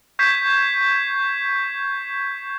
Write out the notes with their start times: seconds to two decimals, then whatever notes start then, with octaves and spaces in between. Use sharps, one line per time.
0.19 C#6 G6 G#6 B6 C7 E7